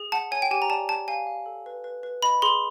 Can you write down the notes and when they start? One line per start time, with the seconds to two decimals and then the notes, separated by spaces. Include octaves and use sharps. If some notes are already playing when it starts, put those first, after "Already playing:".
Already playing: G#4
0.12 F#5 A5
0.31 C#5 G#5
0.42 G5
0.51 G4 G#5
0.62 A#5
0.70 D5 A5
0.89 G5 A5
1.08 F5 G#5
1.27 F5
1.46 A4
1.66 B4
1.84 B4
2.03 B4
2.23 D#5 B5
2.42 G#4 C6